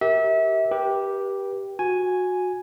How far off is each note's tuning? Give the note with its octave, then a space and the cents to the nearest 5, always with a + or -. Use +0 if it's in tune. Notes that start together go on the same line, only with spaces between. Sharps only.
G4 -10 A#4 +0 E5 -30
G4 +0 B4 -35
F#4 -20 G#5 +0